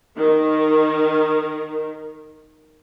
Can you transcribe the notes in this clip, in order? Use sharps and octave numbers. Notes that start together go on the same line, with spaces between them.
D#3 A#4